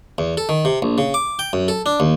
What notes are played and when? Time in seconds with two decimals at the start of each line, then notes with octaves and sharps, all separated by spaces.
0.18 E2
0.37 A4
0.49 D#3
0.65 C3
0.82 A#1
0.98 C#3
1.14 D6
1.39 G5
1.53 F#2
1.68 A4
1.86 D4
2.00 D#2